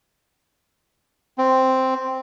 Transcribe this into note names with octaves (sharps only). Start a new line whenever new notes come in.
C4